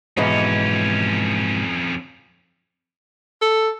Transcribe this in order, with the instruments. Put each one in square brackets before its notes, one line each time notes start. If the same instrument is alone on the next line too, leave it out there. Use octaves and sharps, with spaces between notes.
[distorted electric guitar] F2 C#4 [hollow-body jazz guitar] G#2 B2 E3
[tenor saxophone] A4